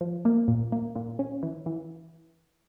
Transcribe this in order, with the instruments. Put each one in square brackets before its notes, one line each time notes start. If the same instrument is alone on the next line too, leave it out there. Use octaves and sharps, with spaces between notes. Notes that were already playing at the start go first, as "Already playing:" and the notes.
[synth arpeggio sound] F3
A#3
A#2
A#3
A#2
C#4
E3
E3